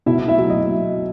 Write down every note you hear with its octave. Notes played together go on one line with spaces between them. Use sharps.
B2 E4 E5
E4 E5
F#3
D#5